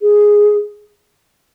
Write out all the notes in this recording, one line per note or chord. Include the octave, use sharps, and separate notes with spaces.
G#4